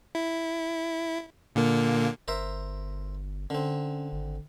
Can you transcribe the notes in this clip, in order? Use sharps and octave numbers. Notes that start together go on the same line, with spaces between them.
E4
A#2 D3 A#3
G1 A#4 C5 E5
D3 C4 C#4
G#1